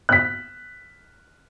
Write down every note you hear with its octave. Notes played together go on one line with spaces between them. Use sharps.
F#6 B6